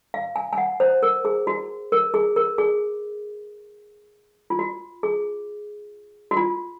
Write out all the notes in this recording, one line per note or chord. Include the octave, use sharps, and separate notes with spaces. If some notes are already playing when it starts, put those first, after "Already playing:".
F5
G#5
G#5
F#5
C5
A#4
G#4
F#4
A#4
G#4
A#4
G#4
F4
F#4
G#4
F#4
F4